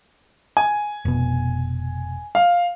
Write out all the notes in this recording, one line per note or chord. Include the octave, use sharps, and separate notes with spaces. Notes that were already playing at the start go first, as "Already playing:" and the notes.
G#5
F1 B2
F5